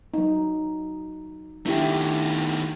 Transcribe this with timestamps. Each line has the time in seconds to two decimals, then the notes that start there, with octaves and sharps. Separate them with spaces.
0.14 F#3 D#4
1.66 D#3 A3 D4 E4 G4